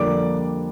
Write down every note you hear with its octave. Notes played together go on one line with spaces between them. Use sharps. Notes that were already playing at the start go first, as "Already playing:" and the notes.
Already playing: F2 D3 G3 A#3 D4 D5 D6